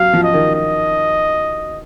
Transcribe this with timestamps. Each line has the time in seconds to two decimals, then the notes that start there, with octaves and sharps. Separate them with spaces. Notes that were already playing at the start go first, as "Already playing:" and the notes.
Already playing: F#3 F5
0.13 F3
0.23 D#5
0.34 D#3
0.55 D#5